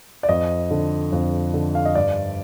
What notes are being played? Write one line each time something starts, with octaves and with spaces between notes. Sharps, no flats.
D5
F2 D#5
D3
F2
D3
F5
D#5
G2 D5